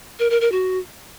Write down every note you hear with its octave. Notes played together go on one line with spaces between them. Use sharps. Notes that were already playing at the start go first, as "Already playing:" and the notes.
A#4
A#4
A#4
F#4